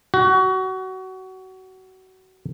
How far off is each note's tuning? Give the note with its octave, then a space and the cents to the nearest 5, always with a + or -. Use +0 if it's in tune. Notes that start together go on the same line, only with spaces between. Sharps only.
F#4 +25